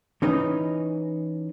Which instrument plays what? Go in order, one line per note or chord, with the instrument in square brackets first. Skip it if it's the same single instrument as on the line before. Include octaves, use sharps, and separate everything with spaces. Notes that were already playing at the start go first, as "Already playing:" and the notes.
[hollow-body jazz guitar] E3 C#4 D#4 B4 D#5